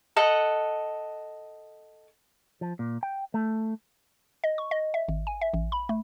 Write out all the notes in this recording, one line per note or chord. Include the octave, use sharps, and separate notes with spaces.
A4 D#5 F#5
F3
A#2
G5
A3
D#5
C#6
D#5
E5
G#1
G#5
E5
A1
B5
A3